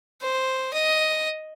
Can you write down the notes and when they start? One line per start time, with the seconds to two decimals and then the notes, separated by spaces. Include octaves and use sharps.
0.22 C5
0.74 D#5